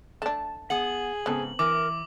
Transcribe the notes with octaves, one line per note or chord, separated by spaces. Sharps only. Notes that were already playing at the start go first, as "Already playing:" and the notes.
A3 D4 A5
B3 G#4 F#5 F#7
G#2 C#3 B3 C4 A4
E3 A#4 D6